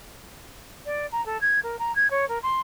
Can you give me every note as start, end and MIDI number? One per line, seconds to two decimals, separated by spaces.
0.86 1.06 74
1.12 1.24 82
1.26 1.40 69
1.41 1.60 92
1.63 1.76 70
1.79 1.95 82
1.95 2.10 92
2.10 2.28 73
2.28 2.38 70
2.43 2.61 84